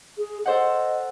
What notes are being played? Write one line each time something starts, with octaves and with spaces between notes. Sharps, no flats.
G#4
A4 C5 D#5 F#5